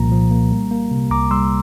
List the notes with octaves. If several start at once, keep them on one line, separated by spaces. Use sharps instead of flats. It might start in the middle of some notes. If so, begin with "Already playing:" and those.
Already playing: C2 A#2 F3 A#3 A#5
F3
A#3
G3
A#3
C3
C2 A#5 D6
G3 C6 E6